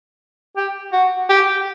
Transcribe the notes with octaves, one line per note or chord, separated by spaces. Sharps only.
G4
F#4
G4